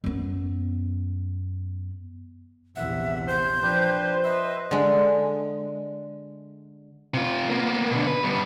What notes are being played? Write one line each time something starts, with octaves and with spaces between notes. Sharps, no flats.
F#2 B3
A#1 E2 C3 E5 F#5
C5 G6
F3 D4 G4 B4
B4 D#5 E5
D3 G#3
C3 F4
A#3 B3
B2 D3
B4
G3 B3